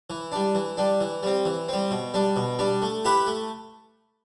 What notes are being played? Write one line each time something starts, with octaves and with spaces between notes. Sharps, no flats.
E3
G3 D4
E3
G3 D4
E3
G3 C4
E3
G3 C4
B2
G3 D4
B2
G3 D4
A3
E4 G4 B4 E5
A3